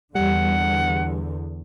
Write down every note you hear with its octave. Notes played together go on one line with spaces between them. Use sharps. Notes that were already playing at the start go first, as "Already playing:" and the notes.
E2 D3 G3 F#5